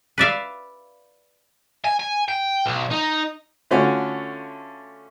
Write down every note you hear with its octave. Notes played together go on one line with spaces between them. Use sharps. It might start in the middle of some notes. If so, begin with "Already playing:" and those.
B4 D5 E5 F5
G#5
G#5
G5
B1
D#4
D3 A3 C#4 F4 F#4 C#5